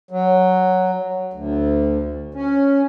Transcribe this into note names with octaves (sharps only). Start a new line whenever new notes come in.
F#3
D2
C#4